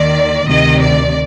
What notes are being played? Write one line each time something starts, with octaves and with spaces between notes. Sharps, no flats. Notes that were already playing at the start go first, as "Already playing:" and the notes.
Already playing: D#2 D#3 D5
D2 C3 D#3 D#5
D5